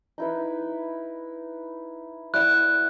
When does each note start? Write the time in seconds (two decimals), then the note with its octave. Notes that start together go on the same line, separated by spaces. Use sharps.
0.18 D#4 E4 B4
2.34 E4 D5 F#5 F#6